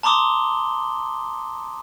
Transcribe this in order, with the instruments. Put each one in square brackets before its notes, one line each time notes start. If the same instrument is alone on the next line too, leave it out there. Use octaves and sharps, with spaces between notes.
[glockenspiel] A5 A#5 C6 D6 D#6 G7